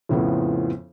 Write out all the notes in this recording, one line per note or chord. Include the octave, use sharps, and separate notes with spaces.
F2 A2 C#3 F3 B3